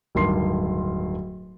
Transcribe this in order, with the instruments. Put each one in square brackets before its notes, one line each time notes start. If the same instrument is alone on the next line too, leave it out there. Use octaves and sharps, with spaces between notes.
[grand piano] D1 G2 D#3 C6 C7